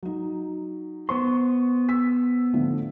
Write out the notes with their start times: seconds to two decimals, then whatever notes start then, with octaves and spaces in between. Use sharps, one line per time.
0.03 F#3 D#4
1.09 B3 C5 C6 C#6
1.89 E6 B6
2.54 A2 D3 F3